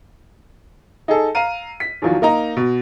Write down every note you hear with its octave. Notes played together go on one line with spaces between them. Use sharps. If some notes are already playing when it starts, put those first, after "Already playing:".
D#4 G#4 A4
F5 A#5 D#7
B6
E2 D#3 F3 F#3
A#3 D#4 A#5
B2